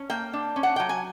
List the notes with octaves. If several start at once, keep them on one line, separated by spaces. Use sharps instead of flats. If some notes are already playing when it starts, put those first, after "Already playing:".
Already playing: C#4
A#3 G5
D4
C#4
F#5
F#3 G5
G#5